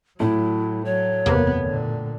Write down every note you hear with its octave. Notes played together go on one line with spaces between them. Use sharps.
A2 F#3 A3 E4
F#3 C#5
F#1 E2 C3 A#3 B3
A#2 D3